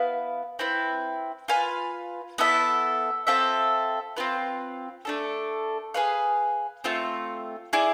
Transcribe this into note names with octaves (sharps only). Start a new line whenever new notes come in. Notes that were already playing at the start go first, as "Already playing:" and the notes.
Already playing: B3 E4 B4 F5
C4 E4 B4
F4 B4 F5 G#5
B3 E4 A4 E5
C4 F4 A4 E5
C4 F4 B4
A3 D4 A4
G#4 B4 F5
A3 C4 F4
E4 G#4 D5